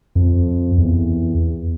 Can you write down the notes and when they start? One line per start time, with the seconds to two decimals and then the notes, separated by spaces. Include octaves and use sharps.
0.15 F2
0.78 E2